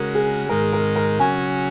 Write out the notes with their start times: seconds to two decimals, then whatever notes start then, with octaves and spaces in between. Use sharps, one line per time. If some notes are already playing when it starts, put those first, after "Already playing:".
Already playing: C#3 G#3 F#4 A#4
0.15 G#4
0.49 G#2 D#3 G#3 A#4
0.73 A#4
0.96 A#4
1.19 C#3 F#3 C#4 F#4 G#5